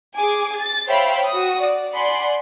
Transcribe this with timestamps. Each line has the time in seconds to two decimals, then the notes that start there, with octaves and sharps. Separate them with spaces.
0.17 G#4 G#5 D6
0.58 A6
0.89 C5 C#5 E5 F5 G5 B5
1.26 F#4 D#6
1.61 D5
1.93 D5 F#5 G#5 B5 C6